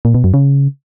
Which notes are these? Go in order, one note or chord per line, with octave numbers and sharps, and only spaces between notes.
A#2
B2
F#2
C#3